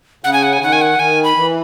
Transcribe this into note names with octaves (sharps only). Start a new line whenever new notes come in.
C#3 F#5
G#5
F#5
G#5
D#3 F#5
G#5
F#5
D#3 G#5
B5
E3